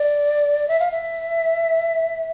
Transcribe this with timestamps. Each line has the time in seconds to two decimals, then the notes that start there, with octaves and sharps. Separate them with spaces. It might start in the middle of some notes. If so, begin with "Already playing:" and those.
Already playing: D5
0.68 E5
0.80 F5
0.91 E5